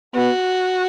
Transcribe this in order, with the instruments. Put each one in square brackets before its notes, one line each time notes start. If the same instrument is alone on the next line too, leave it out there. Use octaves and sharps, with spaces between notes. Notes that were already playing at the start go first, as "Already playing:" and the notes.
[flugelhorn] B3 [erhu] F#4